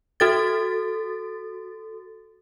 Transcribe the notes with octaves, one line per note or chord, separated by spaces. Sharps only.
F#4 A4 A6